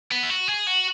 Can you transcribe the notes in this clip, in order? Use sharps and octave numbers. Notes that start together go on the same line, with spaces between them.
B3
E4
F#4
G#4
F#4